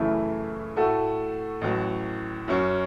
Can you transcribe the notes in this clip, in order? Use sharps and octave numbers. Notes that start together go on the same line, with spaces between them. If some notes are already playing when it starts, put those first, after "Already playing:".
Already playing: F#2 C#3 E3 A3 E4
A2 A3 F#4 A4
A1 A2 F#3
F#2 F#3 C#4